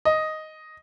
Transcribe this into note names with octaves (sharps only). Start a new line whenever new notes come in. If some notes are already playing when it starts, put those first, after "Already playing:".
D#5